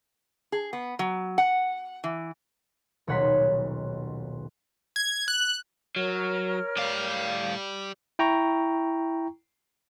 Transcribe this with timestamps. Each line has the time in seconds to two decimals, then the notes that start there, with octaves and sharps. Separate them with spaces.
0.52 G#4
0.73 B3
0.99 F#3
1.38 F#5
2.04 E3
3.07 D#1 B1 C#5 F#5 C6 B6
4.96 G#6
5.28 F#6
5.96 F#3 A#4 C#5 F6
6.77 A2 G4 D5 F5
8.19 E4 G5 A#5 C#6